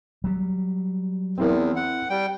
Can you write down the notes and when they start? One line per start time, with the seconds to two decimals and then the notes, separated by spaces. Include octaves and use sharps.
0.24 F#3 G3
1.38 E2 C4 E4 A#4
1.76 F#5
2.10 G3 G5